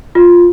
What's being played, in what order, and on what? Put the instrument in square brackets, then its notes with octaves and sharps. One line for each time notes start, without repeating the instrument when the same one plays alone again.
[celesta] F4